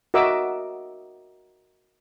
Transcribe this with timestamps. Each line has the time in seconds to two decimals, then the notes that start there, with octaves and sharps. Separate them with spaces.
0.14 F#4 A#4 D#5 E5 D6 E6